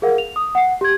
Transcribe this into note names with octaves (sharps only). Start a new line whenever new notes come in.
G#4 A#4 F5 F#5
F7
D#6
F#5 C7
G4 G#6